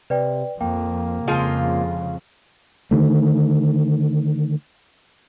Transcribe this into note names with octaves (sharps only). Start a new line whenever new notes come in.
C3 B4 D5 G5
F2 A#3 G5
F2 C#3 F3 G#3 F4
D3 D#3 A3